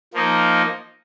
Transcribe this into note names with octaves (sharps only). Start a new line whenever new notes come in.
F3 A#3 D#4